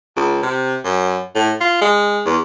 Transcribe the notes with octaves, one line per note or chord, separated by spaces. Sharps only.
C#2
C3
F#2
A2
F4
G#3
E2